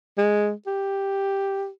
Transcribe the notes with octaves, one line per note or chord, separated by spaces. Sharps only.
G#3
G4